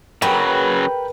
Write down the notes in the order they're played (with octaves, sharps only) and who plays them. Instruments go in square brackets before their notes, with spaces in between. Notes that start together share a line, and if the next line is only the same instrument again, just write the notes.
[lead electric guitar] C#3 F#3 [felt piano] G#4 A#4 G5 [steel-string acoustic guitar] B4